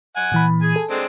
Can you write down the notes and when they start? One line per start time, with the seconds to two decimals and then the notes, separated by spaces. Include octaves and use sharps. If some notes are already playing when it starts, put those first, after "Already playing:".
0.16 F#5 G#5
0.32 A#2 E3 B5
0.62 G#4 G#5
0.76 A4
0.90 G#3 C4 D4